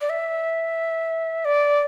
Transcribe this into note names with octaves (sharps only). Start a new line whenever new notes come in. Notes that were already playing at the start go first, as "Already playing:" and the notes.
D5
E5
D5